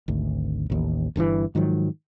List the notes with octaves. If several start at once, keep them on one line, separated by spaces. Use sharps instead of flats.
G#1 D2
A1 D#2
G1 G2 A#2 E3
G#2 D#3 F3 F#3